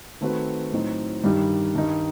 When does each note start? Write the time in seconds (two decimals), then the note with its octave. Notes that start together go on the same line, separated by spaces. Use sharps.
0.21 D#3 A3 C4 F#4 B4
0.72 A2 F#3 C4 D#4
1.24 G2 D#3 G3 D#4 G4
1.75 G2 D#3 G3 D#4